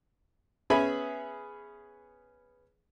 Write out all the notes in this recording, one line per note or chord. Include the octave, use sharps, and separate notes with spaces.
B3 C#4 G#4 E5 G#5 B5